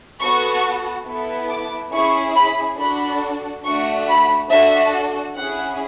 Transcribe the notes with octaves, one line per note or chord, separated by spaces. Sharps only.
B3 F#4 A4 C#6
B3 E4 A4
D6
C#4 E4 G#4 C#6
B5
D4 F#4 A4 B5
A3 D4 F#4 C#6
B5
D4 F#4 A4 E5
C#4 E4 G#4 F#5